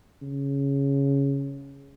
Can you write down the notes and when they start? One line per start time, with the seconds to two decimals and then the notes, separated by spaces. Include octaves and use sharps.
0.22 C#3